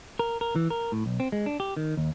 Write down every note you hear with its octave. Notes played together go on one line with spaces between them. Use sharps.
A#4
A#4
E3
A#4
A2
B1
C4
G#3
D4
G4
D#3
D#2